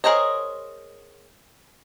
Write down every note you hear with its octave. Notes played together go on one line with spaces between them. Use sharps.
G#4 A#4 C5 C#5 D#5